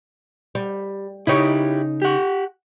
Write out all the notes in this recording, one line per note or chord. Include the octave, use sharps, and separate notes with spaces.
G3
C#3 D#4 E4 G4 C#5
G4 F#5